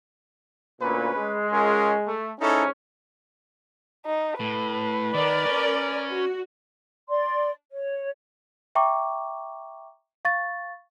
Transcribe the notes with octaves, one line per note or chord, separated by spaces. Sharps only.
D2 A#2 C#4 B4
G#3
C#4 F4 A#4
A3
G#2 C#4 D#4 E4 A4
D#4
A2 B4
D#3 A#4 D5
C#4
F#4
D5 C6
C#5
E5 G5 A#5 C#6 D6
F5 C#6 A6